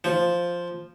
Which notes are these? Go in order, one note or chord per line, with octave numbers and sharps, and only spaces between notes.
F3